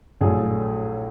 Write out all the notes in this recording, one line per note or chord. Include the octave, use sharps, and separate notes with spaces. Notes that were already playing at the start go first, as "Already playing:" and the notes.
A#1 A2 F#3 A3 G#4